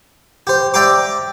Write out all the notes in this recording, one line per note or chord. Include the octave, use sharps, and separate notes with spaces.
G4 C5
D5 E5 G5 A#5 C6 D6